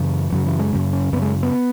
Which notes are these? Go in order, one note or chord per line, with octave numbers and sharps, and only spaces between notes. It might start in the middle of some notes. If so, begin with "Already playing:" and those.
Already playing: F#2 C#3 E3
F#2 C#3 F#3
E3
G#3
F#2 C#3
C#4
F#2 C#3 B3
G#3
B3